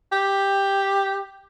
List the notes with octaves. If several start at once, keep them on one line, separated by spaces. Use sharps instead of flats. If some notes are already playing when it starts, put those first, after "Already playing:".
G4